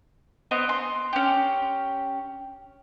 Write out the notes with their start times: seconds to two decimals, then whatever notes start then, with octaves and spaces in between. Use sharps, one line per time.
0.51 B3 C4 D#5
0.69 C6
1.13 C#4 G4